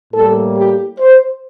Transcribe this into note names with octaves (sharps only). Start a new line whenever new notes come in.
A2 G3 A#3 A4
G4
C5